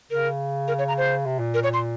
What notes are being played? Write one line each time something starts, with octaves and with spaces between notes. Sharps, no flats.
C#3 A#4
A#4
C#5
A#5
C5
C3
A#2
A#4
C#5
C6